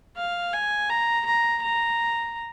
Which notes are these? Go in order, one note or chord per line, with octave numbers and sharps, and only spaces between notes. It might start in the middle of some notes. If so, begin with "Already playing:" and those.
F5
G#5
A#5
A#5
A#5